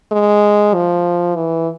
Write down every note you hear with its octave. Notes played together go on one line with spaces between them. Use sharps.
G#3
F3
E3